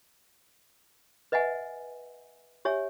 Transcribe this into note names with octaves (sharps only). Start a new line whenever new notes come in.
B4 D#5 E5 F#5 G#5
G4 C#5 E5 G#5